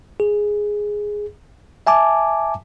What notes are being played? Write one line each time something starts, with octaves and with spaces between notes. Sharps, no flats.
G#4
E5 G#5 A5 D6